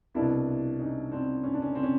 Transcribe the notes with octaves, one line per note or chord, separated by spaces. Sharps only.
C2 B2 D4 E4
C#4 D#4
C4 D4
C#4
D4
C#4
C4
C#4